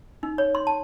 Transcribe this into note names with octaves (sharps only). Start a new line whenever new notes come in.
D#4
C#5
C6
A5